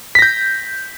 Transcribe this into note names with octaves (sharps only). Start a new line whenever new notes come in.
G6 A#6 B6